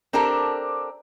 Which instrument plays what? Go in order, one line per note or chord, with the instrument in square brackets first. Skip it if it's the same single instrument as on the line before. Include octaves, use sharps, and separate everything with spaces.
[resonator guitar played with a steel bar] C4 D4 G4 A4 A#4